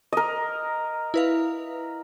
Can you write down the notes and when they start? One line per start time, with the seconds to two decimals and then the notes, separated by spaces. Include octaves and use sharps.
0.12 A#4 D#5
1.14 E4 B4 F5